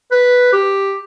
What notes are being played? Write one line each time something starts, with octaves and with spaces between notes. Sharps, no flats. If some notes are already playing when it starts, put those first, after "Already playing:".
B4
G4